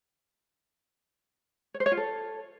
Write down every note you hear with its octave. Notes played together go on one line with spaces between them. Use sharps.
C#5
C5
C#5
F4
A4